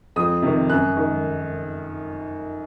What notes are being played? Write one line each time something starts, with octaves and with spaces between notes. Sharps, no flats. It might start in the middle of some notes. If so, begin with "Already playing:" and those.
F2 D#6
C3 D#3
F#2 F#6
D#3